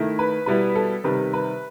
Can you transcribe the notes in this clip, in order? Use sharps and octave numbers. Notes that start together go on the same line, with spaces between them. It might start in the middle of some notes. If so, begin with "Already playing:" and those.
Already playing: D#3 A3 E4
B4
B2 G3 B3 E4 B4
A4
C3 D#3 G3 B4
B4